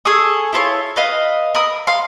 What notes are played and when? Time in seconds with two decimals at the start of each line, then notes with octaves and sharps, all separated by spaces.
0.05 G#4 A4 C#6 D#6
0.53 E4 F4 C5 C#5
0.96 B4 D#5 F5
1.55 A#4 B5 D#6
1.87 F5 C6